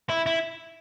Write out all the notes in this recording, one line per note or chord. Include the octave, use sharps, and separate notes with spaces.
E4
E4